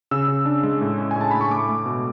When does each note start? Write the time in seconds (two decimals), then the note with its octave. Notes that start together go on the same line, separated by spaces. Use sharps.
0.11 C#3 E6
0.28 C#3
0.45 D4
0.63 G#3
0.81 A2
0.98 C#4
1.11 A2 G#5
1.21 A5
1.31 A2 B5
1.41 C#6
1.50 A3 D6
1.69 A3
1.86 B2